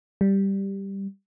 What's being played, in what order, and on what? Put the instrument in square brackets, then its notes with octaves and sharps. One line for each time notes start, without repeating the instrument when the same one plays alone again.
[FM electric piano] G3